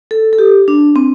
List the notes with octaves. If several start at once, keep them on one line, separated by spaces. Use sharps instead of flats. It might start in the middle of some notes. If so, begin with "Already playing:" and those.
A4
A4
G4
D4
C4